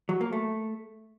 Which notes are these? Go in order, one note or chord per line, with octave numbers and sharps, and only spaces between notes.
F#3
A#3
A3